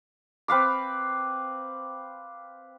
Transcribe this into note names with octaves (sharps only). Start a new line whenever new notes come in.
C4 B4 F5 D6